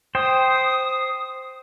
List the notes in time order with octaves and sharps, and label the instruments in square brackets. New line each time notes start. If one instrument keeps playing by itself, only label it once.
[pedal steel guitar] C5 G5 [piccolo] D#6